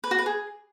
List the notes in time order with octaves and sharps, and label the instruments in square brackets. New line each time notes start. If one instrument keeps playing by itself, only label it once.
[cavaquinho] B4
F#4
B4
G#4